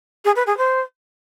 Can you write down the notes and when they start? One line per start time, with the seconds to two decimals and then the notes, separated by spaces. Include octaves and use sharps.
0.25 G#4
0.36 B4
0.46 G#4
0.57 C5